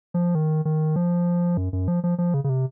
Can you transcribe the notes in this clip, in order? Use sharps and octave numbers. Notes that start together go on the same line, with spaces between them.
F3
D#3
D#3
F3
F#2
F#2
F3
F3
F3
C#3
C#3
C3